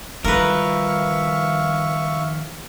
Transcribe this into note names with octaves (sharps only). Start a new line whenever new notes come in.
D#3 F3 G3 A#4 B4 E5 F5 C#6